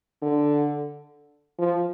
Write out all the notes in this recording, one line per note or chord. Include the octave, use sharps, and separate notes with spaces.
D3
F3